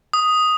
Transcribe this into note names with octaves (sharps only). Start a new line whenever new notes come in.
D#6